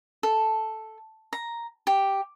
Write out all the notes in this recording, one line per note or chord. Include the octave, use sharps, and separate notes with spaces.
A4
A#5
G4